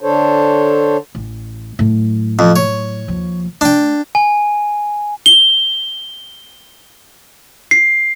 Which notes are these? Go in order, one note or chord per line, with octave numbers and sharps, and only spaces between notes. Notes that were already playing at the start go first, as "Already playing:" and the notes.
D3 D4 A4 C5 C#5
A1
A2 F#3
F2
C#5
D#2 F3
A3 D4 G5
G#5
G7
C7